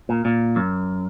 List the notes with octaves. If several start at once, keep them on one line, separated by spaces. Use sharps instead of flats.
A#2
A#2
F#2